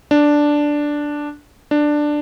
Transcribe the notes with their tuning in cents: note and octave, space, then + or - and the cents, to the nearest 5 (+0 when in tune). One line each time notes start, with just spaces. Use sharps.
D4 +0
D4 +10